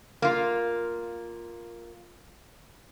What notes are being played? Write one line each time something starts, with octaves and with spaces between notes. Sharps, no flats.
A#3 F4